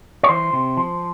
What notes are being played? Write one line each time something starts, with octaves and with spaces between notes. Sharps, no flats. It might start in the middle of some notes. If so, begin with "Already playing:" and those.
C#5
E3 C5
C3
F3